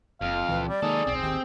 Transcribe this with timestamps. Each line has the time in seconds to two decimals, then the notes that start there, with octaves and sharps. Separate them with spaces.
0.21 F#1 F2 F5
0.49 C#2 A#2 E3 B4
0.69 G3 D5
0.82 D#3 G#3 A#3 D#4 G#4 A4
1.07 D1 B1 C4
1.22 D#1 G#1 D#3 G4